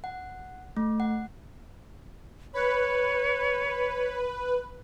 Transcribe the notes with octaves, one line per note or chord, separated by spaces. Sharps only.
F#5
A3
F#5
B4 C#5